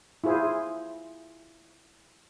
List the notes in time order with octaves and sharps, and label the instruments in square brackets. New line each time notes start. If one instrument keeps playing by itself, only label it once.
[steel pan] E4 F4 G#4 C5